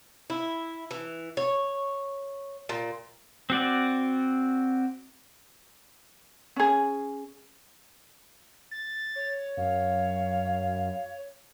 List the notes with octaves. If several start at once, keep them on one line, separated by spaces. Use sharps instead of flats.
E4
E3
C#5
A#2
C4 F#4 D5
C#4 G#4
A6
C#5
F#2 F5